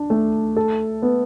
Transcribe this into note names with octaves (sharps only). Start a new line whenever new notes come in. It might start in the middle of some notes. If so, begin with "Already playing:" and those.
Already playing: D4
A3
A4
B3